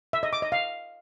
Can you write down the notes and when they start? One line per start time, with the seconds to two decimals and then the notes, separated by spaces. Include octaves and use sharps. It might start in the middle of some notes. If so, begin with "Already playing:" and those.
0.13 E5
0.23 D#5
0.33 D6
0.42 D#5
0.52 F5